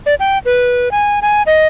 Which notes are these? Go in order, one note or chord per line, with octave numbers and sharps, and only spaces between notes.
D5
G5
B4
G#5
G#5
D#5